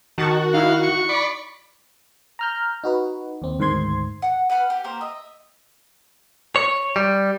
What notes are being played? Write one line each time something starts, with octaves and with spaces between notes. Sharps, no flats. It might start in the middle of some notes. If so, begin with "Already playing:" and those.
D#3 F#4 A5 C#6
D#4 E4 F5
C#6
D5 B5
A#5 F6 G6
D#4 F#4 B4
D#2 C4
D2 G#2 D#3 C5 C6 G#6
F#5
B4 F#5 B5 F6
G4
A#3 G4 A#4 C5
D#5 E5
C#5
G3